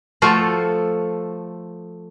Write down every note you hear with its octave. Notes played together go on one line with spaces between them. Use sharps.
F3 A3 F4 F#4 A4